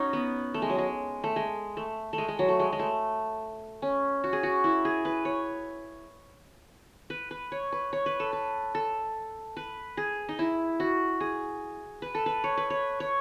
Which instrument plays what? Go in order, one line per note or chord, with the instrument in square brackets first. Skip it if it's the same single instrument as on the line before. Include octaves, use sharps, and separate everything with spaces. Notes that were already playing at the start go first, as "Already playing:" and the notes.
Already playing: [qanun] C#4 D#4 F#4
B3
A3
G#3
F#3
G#3
A3
G#3
A3
A3
G#3
G#3
F#3
A3
G#3
G#3
A3
C#4
F#4
G#4
F#4
E4
G#4
B4
C#5
B4
B4
C#5
B4
C#5
B4
A4
B4
A4
B4
G#4
D#4
E4
F#4
G#4
B4
A4
B4
C#5
B4
C#5
C#5